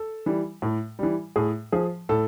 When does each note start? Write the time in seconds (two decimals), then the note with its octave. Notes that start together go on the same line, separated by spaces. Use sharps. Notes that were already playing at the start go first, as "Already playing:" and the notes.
Already playing: A4
0.26 E3 G3
0.62 A2
0.99 E3 G3
1.36 A2 G#4
1.72 F3 G#4
2.09 A2 A4